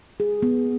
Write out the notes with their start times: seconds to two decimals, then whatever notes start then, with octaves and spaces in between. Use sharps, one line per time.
0.20 G#4
0.42 B3